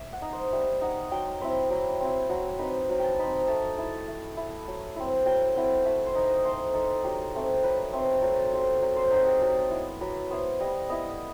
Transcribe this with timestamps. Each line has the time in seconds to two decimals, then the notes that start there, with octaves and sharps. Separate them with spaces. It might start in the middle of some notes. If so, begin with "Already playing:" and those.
Already playing: E5
0.13 F#5
0.22 D#4
0.33 C5
0.52 G3 E5
0.81 D#4 F#5
1.11 F#3 G5
1.41 C4 E4 B5
1.70 F#3 G5
2.01 C4 E4
2.30 F#3 F#5
2.59 C4 D#4 B4
2.90 F#3
2.99 G5 A5
3.19 C4 D#4 B5
3.34 B5
3.48 A3 A5
3.78 E4 A5
4.08 A3
4.37 E4
4.68 F#3
4.96 C4 E4
5.26 F#3 G5
5.55 C4 E4 F#5
5.85 A3 E5
6.06 C5
6.15 D#4
6.26 D#5
6.45 A3 C5
6.74 D#4 A4
7.04 F#3 G4
7.34 A3 C4
7.63 F#3 B4
7.93 A3 C4
8.22 F#3 A4
8.52 C4 D#4 G4
8.82 F#3 D#5
8.96 C5
9.11 C4 D#4 F#4
9.27 G4
9.41 F#3 A4
9.71 B3 E4
10.01 F#3 B4
10.30 B3 E4 C5
10.60 G3 D#5
10.89 B3 E4 D#5